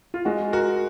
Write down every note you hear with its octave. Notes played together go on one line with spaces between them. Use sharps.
F4
G#3 F#4
F#4 A#4